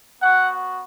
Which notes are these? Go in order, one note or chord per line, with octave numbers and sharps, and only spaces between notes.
B3 F#4 F#5